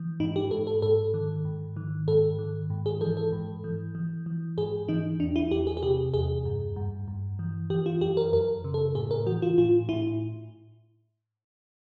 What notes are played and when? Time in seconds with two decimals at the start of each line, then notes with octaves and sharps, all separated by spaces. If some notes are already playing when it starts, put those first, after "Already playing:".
Already playing: E3
0.20 G#2 D#4
0.36 G4
0.51 G#2 A4
0.67 A4
0.82 G#2 A4
1.14 D#3
1.45 G#2
1.76 D#3
2.08 G#2 A4
2.39 D#3
2.70 G#2
2.86 G#4
3.01 E3 A4
3.17 A4
3.32 G#2
3.64 E3
3.95 E3
4.26 E3
4.58 G#2 G#4
4.88 E3 D#4
5.20 E2 D4
5.36 E4
5.51 E2 G4
5.67 G#4
5.77 G#4
5.83 C3 G4
6.14 E2 G#4
6.45 G2
6.76 G2
7.08 G2
7.39 E3
7.70 E3 G4
7.86 F4
8.01 F#2 G4
8.17 A#4
8.33 F#2 A#4
8.64 C#3
8.74 A4
8.95 A2 G#4
9.11 A#4
9.26 E3 F#4
9.42 F4
9.58 A2 F4
9.89 A2 E4